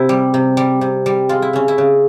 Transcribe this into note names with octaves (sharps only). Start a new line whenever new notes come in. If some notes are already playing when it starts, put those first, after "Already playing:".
Already playing: C3 E4 G4
G3
C3
G3
C3
G3
G#3 F4
E4
C#3 C#4
E4
C#3